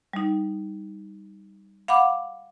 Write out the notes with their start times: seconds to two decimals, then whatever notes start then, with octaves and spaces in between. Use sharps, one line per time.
0.13 G3 D#4
1.88 F5 F#5 B5 D6